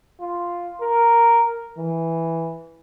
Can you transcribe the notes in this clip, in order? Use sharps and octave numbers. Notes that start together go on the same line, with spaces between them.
F4
A#4
E3